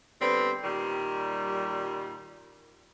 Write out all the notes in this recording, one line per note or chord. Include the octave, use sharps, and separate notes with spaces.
D3 G3 B3 C4
A#2 D#3 G3